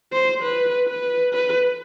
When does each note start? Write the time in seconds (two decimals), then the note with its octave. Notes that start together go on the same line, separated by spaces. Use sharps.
0.13 C5
0.42 B4
0.88 B4
1.33 B4